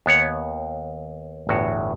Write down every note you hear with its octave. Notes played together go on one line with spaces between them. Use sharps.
D#2 B3 C#5 F#5
G1 E2 A2 F#4